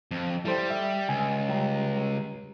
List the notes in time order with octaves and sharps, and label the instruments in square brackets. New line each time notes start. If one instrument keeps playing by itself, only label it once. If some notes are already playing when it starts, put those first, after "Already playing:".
[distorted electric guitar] F2
[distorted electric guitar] G3 [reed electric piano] E4 A4 C5
[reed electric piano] E5
[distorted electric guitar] C#2 [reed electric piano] G#5
[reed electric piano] G3 G4 A#5